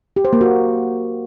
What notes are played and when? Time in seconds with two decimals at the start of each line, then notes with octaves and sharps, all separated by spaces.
0.16 G4
0.25 C5
0.33 A#3
0.41 F#4